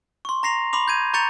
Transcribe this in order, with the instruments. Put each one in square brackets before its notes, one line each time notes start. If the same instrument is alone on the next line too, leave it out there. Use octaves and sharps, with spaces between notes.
[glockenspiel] C6 C#6
A#5 A#6 C7 F7
B5 C6 D6 F7
G6 G#6 D#7
A#5 C#6 G6 A6 C#7 F7